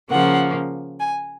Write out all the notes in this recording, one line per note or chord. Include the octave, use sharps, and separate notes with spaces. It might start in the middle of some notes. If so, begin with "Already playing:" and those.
C#3 F3 A#3 F#5
G#5